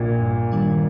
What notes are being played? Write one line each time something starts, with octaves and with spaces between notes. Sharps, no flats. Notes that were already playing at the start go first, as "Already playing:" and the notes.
Already playing: A#1 A#2
G2
D#3 G3 D4